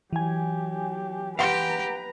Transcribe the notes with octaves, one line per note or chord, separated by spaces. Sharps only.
E3 F#3 G4 G#5
G4 B4 F5 F#5 A#5 C6